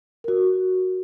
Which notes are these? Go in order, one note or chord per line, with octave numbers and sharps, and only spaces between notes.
F#4 A#4